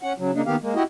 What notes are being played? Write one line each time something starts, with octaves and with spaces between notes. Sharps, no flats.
C#4 F#5
C#3 F#3
C#3 A#3 D4 D#4
D#3 A#3 B3 G4 F5
G#3 A#3
E4 F#4 G4 D#5